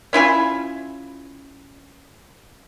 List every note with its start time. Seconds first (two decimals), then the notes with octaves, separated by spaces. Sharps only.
0.13 C#4 E4 F4 G#5